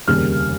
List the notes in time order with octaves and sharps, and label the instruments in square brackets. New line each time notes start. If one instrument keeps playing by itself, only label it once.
[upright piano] F1 D#2 C#3 G3 A#3 F6